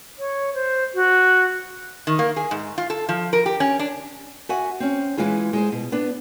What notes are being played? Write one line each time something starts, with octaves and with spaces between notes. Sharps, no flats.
C#5
C5
F#4
D#3
A#3
G#4
G#2
F4
A4
F3
A#4
G4
C#4
D4
F#4 E5 F#5 G#5
C4 C#4
E3 G#3 E4 F4 G#4
G#3 G#4 C5
B2
B3 D4